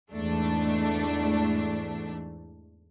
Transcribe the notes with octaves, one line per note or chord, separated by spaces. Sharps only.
E2 G#2 A3 D4